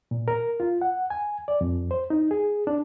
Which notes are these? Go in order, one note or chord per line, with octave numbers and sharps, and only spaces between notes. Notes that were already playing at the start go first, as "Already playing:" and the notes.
A#2
A#4
F4
F#5
G#5
D5
F2
C5
D#4
G#4
D4